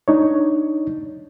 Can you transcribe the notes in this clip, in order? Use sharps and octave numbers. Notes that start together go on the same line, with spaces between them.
D4 D#4 C#5